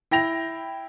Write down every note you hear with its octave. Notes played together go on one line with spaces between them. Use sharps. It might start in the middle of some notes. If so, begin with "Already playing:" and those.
E4 G5 A#6 F7